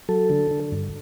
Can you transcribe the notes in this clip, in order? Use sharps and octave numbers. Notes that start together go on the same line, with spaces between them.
F#3 A4
D3
D3
G2